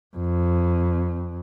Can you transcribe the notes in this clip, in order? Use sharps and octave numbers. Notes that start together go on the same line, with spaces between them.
F2